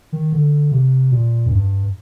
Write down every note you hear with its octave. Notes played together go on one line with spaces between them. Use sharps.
D#3
D3
C3
A#2
F#2
G2